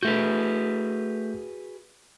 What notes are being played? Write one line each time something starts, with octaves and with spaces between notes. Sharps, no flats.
A3 F#4 G#4 B4 G6